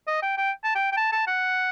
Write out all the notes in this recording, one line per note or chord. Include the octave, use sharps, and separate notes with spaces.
D#5
G5
G5
A5
G5
G5
A5
A5
F#5